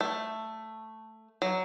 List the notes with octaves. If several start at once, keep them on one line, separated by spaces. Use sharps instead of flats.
A3
F#3